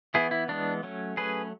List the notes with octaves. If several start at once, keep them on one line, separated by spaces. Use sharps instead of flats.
E3 B3 E4 G#4
E4
E3 G#3 B3 D4
F#3 A3 C#4
F#3 A3 C#4 G#4 B4